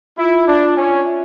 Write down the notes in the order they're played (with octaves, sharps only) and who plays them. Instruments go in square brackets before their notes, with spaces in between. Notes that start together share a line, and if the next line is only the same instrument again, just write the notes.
[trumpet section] E4 [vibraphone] F4
[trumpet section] D4 [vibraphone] F4
[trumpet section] C#4 [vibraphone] C#5
[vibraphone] E5